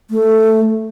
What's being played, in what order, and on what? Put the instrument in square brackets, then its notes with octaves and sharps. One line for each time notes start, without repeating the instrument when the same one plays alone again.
[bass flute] A3